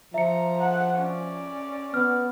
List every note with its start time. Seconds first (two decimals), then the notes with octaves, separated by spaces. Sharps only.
0.14 F3 E5 A#5 C#7
0.60 F#5
0.97 C#4 D5
1.94 B3 F6